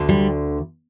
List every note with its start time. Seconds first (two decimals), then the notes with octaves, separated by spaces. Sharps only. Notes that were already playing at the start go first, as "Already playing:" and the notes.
Already playing: D2 D3
0.09 G3